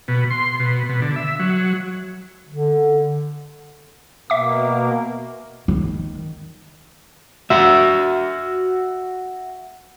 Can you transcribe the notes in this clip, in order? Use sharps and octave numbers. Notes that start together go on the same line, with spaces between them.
B2
C6
B2
B2
D3
E5
F#3
D3
B2 A#3 E5 D6
D#3
F#4 E5